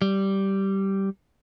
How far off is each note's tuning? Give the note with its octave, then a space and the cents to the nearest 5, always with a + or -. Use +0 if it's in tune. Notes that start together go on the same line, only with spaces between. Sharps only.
G3 -10